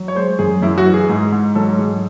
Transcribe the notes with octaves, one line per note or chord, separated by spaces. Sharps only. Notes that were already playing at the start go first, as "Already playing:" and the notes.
Already playing: F#3
C#5
G#3 C5
F#2 G#4
F#2 E4
F#4
E3
G#4
G#2
G#2
F#3 A4
F#3 G#4